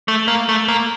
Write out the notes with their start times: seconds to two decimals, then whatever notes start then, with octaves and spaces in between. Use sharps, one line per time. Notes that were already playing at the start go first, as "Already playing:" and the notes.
0.08 A3
0.28 A#3
0.49 A3
0.68 A#3